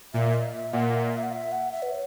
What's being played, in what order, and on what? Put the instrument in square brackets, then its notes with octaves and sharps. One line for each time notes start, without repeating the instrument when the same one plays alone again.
[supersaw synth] A#2 [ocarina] E5
[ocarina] D#5
E5
[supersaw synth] A#2 [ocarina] F#5
[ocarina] E5
E5
F#5
E5
F#5
E5
B4
C#5